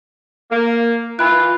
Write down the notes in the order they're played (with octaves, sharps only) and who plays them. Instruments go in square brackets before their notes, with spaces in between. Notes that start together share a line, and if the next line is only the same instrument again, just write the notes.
[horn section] A#3
[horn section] E3 F4 [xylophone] B5 F#6